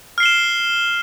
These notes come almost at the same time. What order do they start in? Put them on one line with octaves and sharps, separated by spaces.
F6 C7 G7 E7